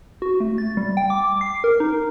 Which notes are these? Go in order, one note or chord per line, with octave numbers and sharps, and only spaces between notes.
F#4
A3
A6
G3
G5
D6
C7
A#4
D#4